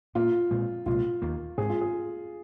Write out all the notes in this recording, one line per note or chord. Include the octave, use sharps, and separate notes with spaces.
A#2 A#3 F4
A#2 G#3 C4
C2 A#2 G#3 F4
D#2 D#3 A#3
G#2 G#3 C4 G#4
F4
G#4